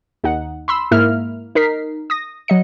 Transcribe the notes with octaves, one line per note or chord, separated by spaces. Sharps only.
D#2 D#4 F#5
B5 C6 E6
G#2 A#3 E4 A#4 E5 F6
D#4 A#4 B6 C7
D#6 A#6
F#3 D#5 C#7